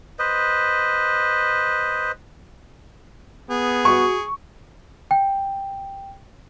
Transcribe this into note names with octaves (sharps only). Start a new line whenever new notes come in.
B4 C5 D#5
B3 G#4
F#4 C#6
G5